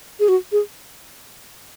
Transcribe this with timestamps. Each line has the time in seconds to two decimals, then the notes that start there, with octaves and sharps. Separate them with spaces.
0.20 G#4
0.28 F#4
0.52 G#4